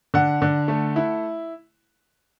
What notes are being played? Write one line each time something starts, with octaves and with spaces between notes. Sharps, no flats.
D3 F#5
D3
A3
E4